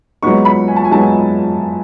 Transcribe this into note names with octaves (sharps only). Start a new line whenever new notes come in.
G#2 F#3 B3 D#4 C#6
B5
G#5
A5
G#5
G#2 F#3 B3 D#4 A5
G#5